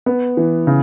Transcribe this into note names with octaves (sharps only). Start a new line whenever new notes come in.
B3
E3
C#3